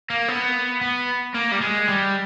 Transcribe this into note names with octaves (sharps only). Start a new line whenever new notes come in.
A#3
B3
B3
A#3
G3
G#3
G3